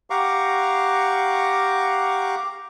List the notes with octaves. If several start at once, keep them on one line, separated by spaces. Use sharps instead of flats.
G4 F5 F#5 A#5 C#6 D6